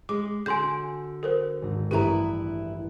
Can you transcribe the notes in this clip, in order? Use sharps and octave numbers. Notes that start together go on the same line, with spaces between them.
G#3 D6
D3 F#4 G#5 C6 G6
A4 A#4 C5
G#1 D#2 A#6
A1 G2 E4 G4 A4 B4 A#5 D#6